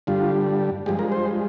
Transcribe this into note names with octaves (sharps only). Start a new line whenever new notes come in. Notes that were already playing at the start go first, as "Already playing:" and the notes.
G2 D3 G3 F4
G2 F3 G#3 G4
A#4
C5